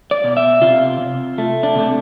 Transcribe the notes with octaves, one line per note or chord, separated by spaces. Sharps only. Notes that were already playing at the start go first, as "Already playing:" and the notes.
D5
B2
E5
C3 F4
C3
A3
D4
C3 A3